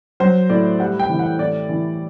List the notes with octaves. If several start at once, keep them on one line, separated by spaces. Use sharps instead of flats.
F#3 C5
A2 D5
G3 F#5
G5
E3
F#5
A2 D5
E3